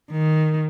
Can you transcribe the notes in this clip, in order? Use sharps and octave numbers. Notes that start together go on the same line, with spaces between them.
D#3